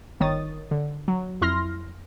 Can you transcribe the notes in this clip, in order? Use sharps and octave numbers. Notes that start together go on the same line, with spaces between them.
G1 D#3 C#5 D#6 A6
D3
F#3
F2 E4 C6 F6 A#6